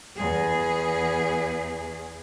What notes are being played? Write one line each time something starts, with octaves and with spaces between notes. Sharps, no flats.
E2 G#4